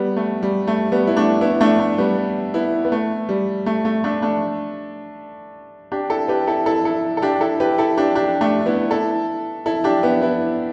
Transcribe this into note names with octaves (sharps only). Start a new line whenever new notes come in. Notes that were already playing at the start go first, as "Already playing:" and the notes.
Already playing: G3 B3
A3
G3
A3
G3 B3
E4
A3 D4
B3 E4
A3 D4
A3
G3 B3
B3 E4
B3
A3
G3
A3
A3
A3 D4
A3 D4
D4 G4
E4 A4
G4 B4
E4 A4
E4 A4
E4 A4
A4
D4 G4
E4 A4
G4 B4
E4 A4
D4 G4
D4 G4
A3 D4
B3 E4
E4 A4
E4 A4
D4 G4
B3 E4
B3 E4